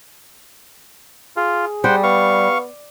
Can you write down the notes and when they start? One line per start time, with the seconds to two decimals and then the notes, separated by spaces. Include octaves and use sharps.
1.36 F4 G#4
1.84 G3 C5 F#5 G5
2.03 B3 F5 C#6